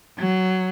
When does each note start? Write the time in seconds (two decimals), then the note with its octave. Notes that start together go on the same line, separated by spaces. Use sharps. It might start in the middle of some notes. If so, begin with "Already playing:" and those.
0.18 F#3